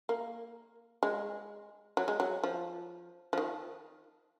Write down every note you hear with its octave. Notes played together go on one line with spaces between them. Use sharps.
A#3
G#3
F#3
G#3
F#3
F3
F3
D#3